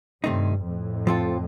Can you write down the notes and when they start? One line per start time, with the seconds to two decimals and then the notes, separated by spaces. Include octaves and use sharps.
0.24 G2 C3 D#3 A3 C4 D#4
0.66 F2 A2
1.07 F3 C4 F4 A4